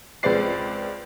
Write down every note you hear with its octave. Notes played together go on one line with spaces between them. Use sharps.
C#2 G#3 C4 B4 D5 C7